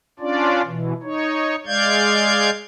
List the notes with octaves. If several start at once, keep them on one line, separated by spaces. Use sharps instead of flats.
C#4 D4 F4 D5
B2 E3
D#4 C#5
G#3 D5 F5 G6 G#6